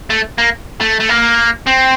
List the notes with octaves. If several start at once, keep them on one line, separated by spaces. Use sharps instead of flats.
A3
A#3
A3
A3
A#3
C4